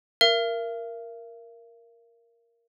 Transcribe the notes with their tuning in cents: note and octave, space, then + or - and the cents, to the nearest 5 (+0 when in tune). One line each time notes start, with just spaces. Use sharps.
A#4 +0 E5 +45